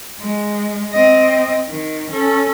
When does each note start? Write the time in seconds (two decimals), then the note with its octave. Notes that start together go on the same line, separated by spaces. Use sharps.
0.20 G#3
0.93 C4 D#5
1.69 D#3
2.11 C#4 A4